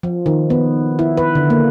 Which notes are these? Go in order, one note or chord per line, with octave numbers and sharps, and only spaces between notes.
F3
D#3
B3
E4
B4
D3
A#3